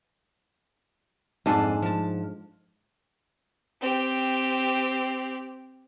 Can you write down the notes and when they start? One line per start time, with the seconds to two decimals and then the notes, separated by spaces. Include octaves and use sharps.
1.46 F2 G#2 D4 A4 C5 G#5
1.82 F3 A5
3.81 C4 G4